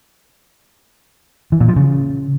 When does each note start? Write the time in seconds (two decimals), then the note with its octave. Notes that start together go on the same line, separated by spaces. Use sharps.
1.52 E3
1.60 A#2
1.68 F3
1.76 C#3